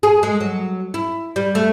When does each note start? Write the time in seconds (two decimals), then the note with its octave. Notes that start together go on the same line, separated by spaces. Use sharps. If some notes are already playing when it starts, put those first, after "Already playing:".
0.03 G#4
0.23 G#3
0.40 F#3
0.94 E4
1.36 G3
1.55 A3